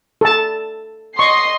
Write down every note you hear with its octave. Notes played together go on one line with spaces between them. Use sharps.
A4 A5
D#5 C6 C#6 C7